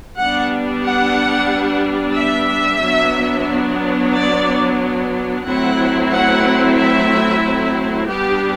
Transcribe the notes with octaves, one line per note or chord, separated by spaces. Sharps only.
G3 B3 D4 F#5
F#5
E5
F#3 B3 D4
D5
F#3 A3 C4 E4 F#5
F#5
E5
G3 B3 D4 G4